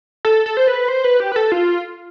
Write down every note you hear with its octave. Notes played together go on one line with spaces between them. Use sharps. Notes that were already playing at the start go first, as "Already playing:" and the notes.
A4
A4
C5
B4
C5
B4
G4
B4
A4
F4